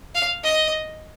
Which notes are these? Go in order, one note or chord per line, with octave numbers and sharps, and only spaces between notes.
F5
D#5